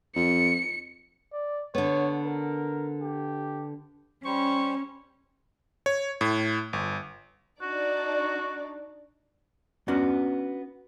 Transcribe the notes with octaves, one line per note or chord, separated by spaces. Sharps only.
F2 C#7
D5
D3 B3 C#5
A#4
G4
G3 C#4 C5 C#6
C#5
A2
G1
D4 D#4 F#4 D5
B3 C#4 D4 F#4